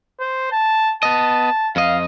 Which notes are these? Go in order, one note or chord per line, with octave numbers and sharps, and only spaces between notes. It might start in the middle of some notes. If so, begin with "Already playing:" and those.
C5
A5
B3 D#5 A5
F2 D#5 F5